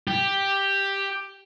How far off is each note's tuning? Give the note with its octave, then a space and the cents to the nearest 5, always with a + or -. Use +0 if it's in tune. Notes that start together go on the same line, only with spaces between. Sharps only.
G4 +5